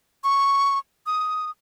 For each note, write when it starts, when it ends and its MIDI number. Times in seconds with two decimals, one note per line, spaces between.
0.24 0.79 85
1.06 1.51 87